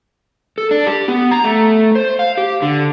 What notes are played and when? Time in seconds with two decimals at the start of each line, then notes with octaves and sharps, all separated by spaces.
0.58 A4
0.71 D4
0.86 G4
1.08 B3
1.31 A#5
1.44 A3
1.95 C5
2.19 F5
2.38 G4
2.62 D3